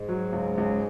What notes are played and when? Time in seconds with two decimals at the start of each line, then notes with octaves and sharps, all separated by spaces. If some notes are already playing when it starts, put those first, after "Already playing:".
Already playing: G#2
0.09 F#3
0.32 C#2
0.57 C#2